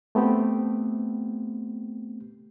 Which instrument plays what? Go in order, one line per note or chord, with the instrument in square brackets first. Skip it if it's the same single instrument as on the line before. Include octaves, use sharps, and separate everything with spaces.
[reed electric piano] A3 B3 C4 G4